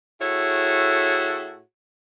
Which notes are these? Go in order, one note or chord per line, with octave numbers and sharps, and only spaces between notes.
A2 E4 F#4 G#4 A4 C#5